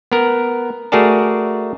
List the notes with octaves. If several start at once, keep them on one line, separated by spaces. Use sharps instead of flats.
B3 A#4
A3 F#4 G#4 A#4 D5 A5